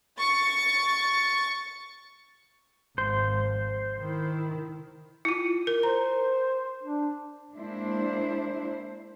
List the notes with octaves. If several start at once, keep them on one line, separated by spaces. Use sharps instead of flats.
C#6 A6
G#1 F3 C5
D#3 E4
E4 F4
A#4
C5 A#5
D4
G#3 A#3 D4 E4 C5